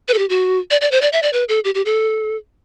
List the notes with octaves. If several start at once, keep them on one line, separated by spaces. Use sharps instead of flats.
B4
A4
G4
F#4
D5
D5
C5
D5
E5
D5
B4
A4
G4
G4
A4